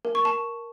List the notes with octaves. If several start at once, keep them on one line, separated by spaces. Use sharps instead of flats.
A#4
C#6
A5